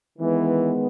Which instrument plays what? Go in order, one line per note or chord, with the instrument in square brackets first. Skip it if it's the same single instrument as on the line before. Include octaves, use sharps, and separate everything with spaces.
[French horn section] D#3 G#3 B3 [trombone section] E3